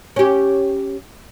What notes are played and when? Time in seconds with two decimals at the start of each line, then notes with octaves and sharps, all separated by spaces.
0.16 C#4 G4